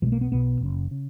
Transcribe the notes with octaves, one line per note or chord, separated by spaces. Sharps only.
B1 B2 F3 G#3
A#3
B3
B1 B2 B3
F#1 F#2 C#3
C#3